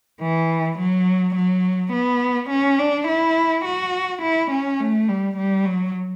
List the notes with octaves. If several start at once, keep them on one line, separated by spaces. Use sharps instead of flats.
E3
F#3
F#3
B3
C#4
D4
E4
F#4
E4
C#4
A3
G3
G3
F#3